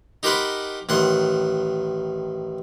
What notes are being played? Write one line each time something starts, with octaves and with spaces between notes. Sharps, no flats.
D#4 G4 A#4 C5 F#5 B5
A1 D#3 F#5 C6